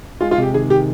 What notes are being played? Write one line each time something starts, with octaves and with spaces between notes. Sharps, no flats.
G#3 F4
F4
C3 G4
D#3 G#4
D#3 G4